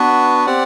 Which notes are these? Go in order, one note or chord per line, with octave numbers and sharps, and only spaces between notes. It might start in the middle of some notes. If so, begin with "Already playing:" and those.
Already playing: B3 D4 F#4 B4
C4 G4 D5 F#5